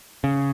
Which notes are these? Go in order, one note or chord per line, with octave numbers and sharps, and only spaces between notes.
C#3